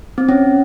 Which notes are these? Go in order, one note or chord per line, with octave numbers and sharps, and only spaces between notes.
C4
C#4